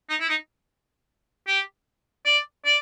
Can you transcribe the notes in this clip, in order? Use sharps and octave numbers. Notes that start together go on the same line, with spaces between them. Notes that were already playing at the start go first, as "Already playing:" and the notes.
D#4
E4
D#4
G4
D5
D5